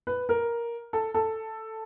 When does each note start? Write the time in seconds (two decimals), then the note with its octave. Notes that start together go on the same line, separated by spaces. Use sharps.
0.07 B4
0.29 A#4
0.93 A4
1.14 A4